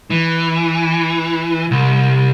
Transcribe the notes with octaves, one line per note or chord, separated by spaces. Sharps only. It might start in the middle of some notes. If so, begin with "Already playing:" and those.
E3
C2